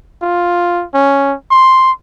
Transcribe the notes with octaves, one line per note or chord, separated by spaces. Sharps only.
F4
C#4
C6